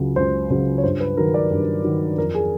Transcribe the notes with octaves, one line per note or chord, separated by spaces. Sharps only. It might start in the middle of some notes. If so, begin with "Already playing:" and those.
Already playing: C#2 C#3 F#3
C#2 C5
C#3 F#3 C5
C#5
G2 C5
B4
D#3 F#3 A#4
D5
G2
D#3 F#3
F2 A#4
G#4